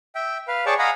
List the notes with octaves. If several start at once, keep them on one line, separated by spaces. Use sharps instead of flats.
E5 G5
B4 F5
G#4 C#5 D5 G5 A5 C#6
D#5 F5 F#5 G#5 A#5 B5